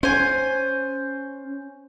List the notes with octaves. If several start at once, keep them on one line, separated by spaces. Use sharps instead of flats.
C#4 C5 G#5